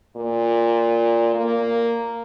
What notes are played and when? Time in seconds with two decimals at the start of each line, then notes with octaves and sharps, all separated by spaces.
0.16 A#2
1.35 A#3